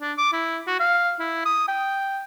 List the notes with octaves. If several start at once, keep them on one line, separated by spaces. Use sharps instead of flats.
D4
D6
E4
F#4
F5
E4
D#6
G5